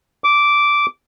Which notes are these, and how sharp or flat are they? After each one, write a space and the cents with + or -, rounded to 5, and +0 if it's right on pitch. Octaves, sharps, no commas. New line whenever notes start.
D6 -10